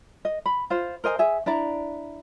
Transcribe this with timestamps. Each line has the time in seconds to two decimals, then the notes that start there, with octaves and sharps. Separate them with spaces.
0.25 D#5
0.46 B5
0.70 F4 C5
1.04 A#4 C5 D#5 G#5
1.19 G#4 E5 G#5
1.46 D4 E4 D5 A#5